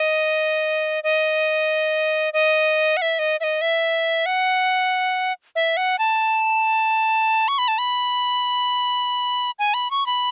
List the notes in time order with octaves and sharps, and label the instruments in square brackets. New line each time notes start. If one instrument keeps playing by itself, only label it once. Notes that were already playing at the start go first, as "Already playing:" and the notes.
Already playing: [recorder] D#5
D#5
D#5
F#5
E5
D#5
E5
D#5
E5
F#5
E5
F#5
A5
C#6
B5
A5
B5
G#5
B5
C#6
B5